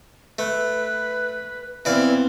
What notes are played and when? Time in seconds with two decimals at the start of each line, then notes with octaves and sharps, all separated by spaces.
0.39 A3 B4
1.85 E3 B3 C4 E4 D5 F5